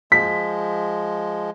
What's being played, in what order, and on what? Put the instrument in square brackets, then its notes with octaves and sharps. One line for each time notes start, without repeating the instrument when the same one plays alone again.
[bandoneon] F3 G#3 [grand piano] B6